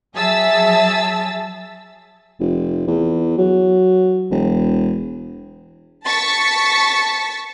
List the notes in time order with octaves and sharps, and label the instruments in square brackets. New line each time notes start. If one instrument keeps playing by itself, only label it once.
[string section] F#3 G#4 E5 A5 E6 A6
[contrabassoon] F1
E2
F#3
E1
[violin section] A5 C#6 A6 B6 C#7